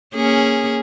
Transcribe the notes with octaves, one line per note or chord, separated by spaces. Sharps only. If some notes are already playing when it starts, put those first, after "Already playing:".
A#3 C#4 G#4